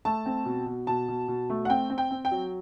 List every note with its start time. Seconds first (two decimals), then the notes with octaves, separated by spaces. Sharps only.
0.05 A3 A5
0.26 C4
0.45 B2
0.66 B2
0.87 B2 A5
1.08 B2
1.28 B2
1.50 A3
1.65 F#5
1.69 C4 G5
1.90 C4
1.98 G5
2.11 C4
2.25 G5
2.31 F#3